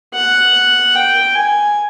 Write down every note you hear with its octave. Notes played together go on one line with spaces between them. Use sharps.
F#5
G5
G#5